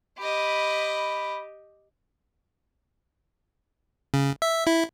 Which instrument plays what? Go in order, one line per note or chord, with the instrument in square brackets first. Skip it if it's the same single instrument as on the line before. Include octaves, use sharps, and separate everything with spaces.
[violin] G4 D#5 [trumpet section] B5
[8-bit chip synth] C#3
E5
E4